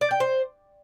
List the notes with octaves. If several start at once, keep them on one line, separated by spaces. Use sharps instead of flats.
D5
G5
C5